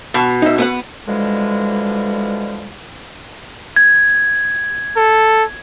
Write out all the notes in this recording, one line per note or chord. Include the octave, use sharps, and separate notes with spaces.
B2
D#4 E5
B3 E5 F#5
B2 D3 E3 F3 G3 G#3
G#6
A4